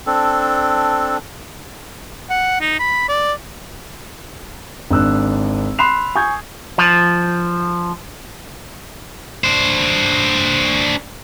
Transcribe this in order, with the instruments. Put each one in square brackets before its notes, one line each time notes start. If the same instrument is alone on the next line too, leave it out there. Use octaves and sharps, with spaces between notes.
[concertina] C4 D4 A4
[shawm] F#5
D#4
B5
D5
[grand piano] G#1 D4 E6 F#6
B5 C6 F#6 C7 E7 F7
G#5 C#6 D#6 G6 G#6
[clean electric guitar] F3
[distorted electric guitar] D4 C5